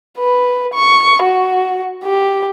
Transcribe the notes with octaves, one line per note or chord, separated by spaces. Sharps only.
B4
C#6
F#4
G4